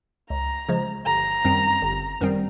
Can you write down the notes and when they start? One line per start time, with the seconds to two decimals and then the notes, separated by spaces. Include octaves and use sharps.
0.30 C#2 A#5
0.69 C#3 F3 G#3
1.06 G1 A#5
1.44 F#2 D#3 G3 C4
1.82 G1
2.21 F#2 D#3 G3 C4